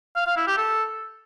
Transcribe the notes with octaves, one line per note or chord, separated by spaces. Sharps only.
F5
F5
E4
G4
A4